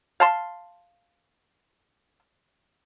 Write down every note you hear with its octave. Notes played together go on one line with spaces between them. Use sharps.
F5 A5 C6